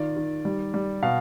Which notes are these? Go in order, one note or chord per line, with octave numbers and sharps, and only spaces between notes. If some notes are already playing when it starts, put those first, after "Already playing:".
Already playing: D#3 F4 D5
D#3
G3
G3
B2 F5